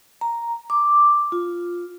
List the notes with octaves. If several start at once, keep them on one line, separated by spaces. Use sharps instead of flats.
A#5
D6
F4